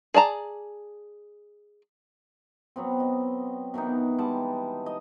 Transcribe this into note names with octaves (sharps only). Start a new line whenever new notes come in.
G#4 D5 A5 A#5
F#3 B3 C4
D#5
B2 D#3 E3 D#4
G3 G#3 F#5 A5
D#5